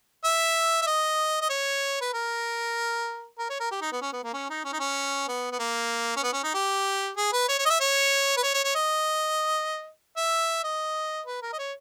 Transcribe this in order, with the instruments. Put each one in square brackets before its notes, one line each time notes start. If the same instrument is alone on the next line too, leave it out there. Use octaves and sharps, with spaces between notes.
[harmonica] E5
E5
D#5
D#5
C#5
B4
A#4
A#4
C#5
A#4
G4
D#4
B3
C#4
B3
A#3
C#4
D#4
C#4
D#4
C#4
B3
B3
A#3
C#4
B3
C#4
D#4
G4
G#4
B4
C#5
C#5
D#5
E5
C#5
B4
C#5
C#5
C#5
D#5
E5
D#5
B4
A#4
D#5
C#5